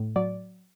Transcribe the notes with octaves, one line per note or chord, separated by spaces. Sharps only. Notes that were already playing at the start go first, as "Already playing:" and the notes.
Already playing: A2
F#3 D5